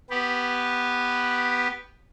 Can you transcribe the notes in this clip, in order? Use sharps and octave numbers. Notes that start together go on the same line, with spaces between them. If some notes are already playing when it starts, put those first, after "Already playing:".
B3 G4 B4